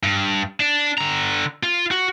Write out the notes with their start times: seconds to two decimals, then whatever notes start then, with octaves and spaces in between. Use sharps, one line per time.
0.03 G2
0.60 D4
0.98 D3 A#5
1.63 F4
1.91 F#4